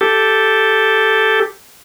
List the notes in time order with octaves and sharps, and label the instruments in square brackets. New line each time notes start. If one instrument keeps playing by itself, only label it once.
[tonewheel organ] G4 A4